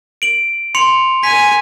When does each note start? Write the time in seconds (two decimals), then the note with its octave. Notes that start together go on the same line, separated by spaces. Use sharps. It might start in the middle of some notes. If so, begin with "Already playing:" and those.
0.22 D7 F#7
0.75 C6 C#7 F7
1.24 G#5 B6